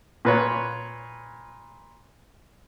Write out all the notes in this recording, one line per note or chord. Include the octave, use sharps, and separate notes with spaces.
A#2 B4 C#5